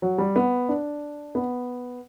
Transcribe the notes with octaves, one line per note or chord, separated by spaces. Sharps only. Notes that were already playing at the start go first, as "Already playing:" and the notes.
F#3
G3
B3
D4
B3